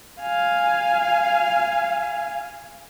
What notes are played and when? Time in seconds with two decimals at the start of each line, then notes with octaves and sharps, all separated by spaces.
0.21 F5 G#5